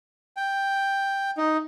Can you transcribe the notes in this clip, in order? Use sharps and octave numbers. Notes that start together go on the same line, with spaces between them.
G5
D#4